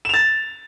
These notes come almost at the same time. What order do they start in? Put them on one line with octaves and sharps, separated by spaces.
E7 F7 A6